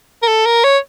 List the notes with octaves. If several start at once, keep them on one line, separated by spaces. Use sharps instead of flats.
A#4
A4
A#4
C#5